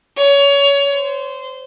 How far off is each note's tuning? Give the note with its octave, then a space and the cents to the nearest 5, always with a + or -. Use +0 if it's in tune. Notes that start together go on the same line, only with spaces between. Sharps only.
C#5 +20
C5 -15